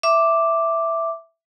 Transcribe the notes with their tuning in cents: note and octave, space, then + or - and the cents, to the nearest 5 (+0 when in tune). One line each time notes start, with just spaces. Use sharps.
E5 +0 D6 +0